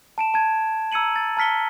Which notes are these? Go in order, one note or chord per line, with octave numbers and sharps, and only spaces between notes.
A5 D7 E7
A5 G#6
A#5 E6 G#6 C#7 D#7 F#7
A6
A5 A#5 F6 B6 C#7 G7